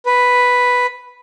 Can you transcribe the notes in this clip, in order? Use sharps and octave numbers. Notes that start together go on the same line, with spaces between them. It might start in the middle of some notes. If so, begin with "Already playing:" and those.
B4